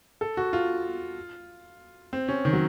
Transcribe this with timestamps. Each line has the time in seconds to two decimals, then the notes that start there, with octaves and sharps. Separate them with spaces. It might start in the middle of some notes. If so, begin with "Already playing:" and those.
0.21 A4
0.37 F#4
0.53 F4
2.13 C4
2.28 C#4
2.45 D#3
2.53 F#3